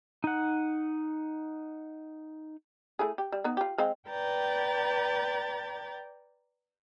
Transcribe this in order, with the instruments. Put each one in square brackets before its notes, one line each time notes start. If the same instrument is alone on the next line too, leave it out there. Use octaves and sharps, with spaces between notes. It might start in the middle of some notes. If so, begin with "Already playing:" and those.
[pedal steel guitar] D#4 F#5
[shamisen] A3 E4 G#4
G4
G3
B3 D#4
F4 G4
G#3 C4 F5
[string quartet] B4 D5 G5 A#5 G6 A6